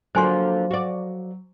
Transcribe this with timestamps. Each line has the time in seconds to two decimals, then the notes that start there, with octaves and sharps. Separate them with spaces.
0.15 D3 F3 F#3 A#3 C5 G#5 C6
0.71 F#4 D5